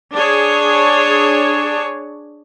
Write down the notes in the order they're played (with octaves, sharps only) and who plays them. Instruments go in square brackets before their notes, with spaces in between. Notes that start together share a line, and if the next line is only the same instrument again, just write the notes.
[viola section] D4 G#4 C#5